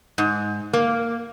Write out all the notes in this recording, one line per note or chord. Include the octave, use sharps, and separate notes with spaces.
G#2
A#3